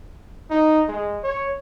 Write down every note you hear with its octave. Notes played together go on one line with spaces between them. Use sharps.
D#4
G#3
C#5